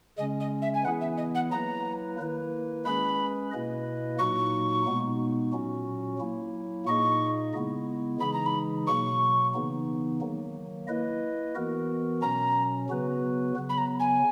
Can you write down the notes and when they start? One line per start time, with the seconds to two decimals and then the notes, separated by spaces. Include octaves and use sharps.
0.18 C#3 G#3 C#4 D#5
0.40 D#5
0.62 E5
0.74 G#5
0.84 E3 B3 E4 G#4 F#5
1.01 E5
1.17 D#5
1.35 F#5
1.51 F#3 A#3 E4 B4 A#5
2.19 D#3 A#3 E4 B4
2.85 G#3 C#4 G#4 B4 B5
3.51 B2 A#3 E4 B4 D#5
4.19 A#2 F#3 A#3 D#4 F#4 C#6
4.85 B2 G#3 B3 D#4
5.52 A#2 F#3 C#4 F#4
6.19 F#3 A#3 E4
6.86 A#2 A#3 D#4 G#4 D#5 C#6
7.54 C#3 G#3 B3 E4
8.20 C#3 E3 G#3 D#4 G#4 B5
8.33 A#5
8.46 B5
8.87 B2 F#3 A#3 C#6
9.54 C#3 E3 B3 D#4
10.21 D#3 F#3 A#3
10.87 A#3 E4 B4 D#5
11.55 E3 B3 F#4 A#4
12.21 B2 F#3 C#4 A#5
12.89 C#3 F#3 B3 F#4 B4
13.56 C#3 F#3 B3
13.69 B5
13.78 A#5
13.99 G#5